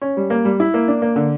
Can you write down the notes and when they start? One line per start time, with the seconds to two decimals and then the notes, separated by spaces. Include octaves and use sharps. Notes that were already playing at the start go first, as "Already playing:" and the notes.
0.02 C#4
0.17 G3
0.30 A#3
0.45 G3
0.60 E4
0.74 A#3
0.88 D4
1.02 A#3
1.16 D3